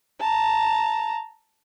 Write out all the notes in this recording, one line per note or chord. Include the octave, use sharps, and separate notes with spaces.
A5 A#5